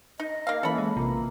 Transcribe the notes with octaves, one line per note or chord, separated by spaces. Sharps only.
D#4 D#5
A#3 F5
E3 A#3 C#4 A4 B5
G#3
A#1 C3 A#3 F4 A#5